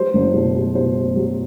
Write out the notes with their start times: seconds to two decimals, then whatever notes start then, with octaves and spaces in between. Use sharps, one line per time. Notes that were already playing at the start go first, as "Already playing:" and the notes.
Already playing: F#3 C5
0.14 F#1
0.34 B2
0.55 F#3
0.75 B2 C5
0.96 F#3
1.16 F#3